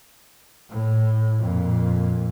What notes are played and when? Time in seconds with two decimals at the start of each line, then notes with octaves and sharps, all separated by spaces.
0.70 A2
1.40 F2 A#2